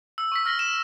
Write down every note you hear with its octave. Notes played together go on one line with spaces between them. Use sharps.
E6
C#6 E6 B6
F6 A#6 B6 G7
E7